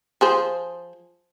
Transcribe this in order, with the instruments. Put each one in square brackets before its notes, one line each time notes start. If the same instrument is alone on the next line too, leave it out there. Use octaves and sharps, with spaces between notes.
[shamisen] F3 G#4 C5